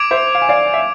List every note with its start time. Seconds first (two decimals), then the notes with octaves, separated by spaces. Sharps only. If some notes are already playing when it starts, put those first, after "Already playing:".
Already playing: D6 G#6 D7 F7
0.11 C5 E5
0.35 F5
0.42 G#5
0.49 D5 F5
0.74 E5